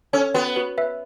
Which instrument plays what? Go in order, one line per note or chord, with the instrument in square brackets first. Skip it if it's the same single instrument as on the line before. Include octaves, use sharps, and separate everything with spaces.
[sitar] C#4 [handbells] A4 C#5
[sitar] B3 [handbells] F#4 B4
[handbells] F#4 B4
B4 E5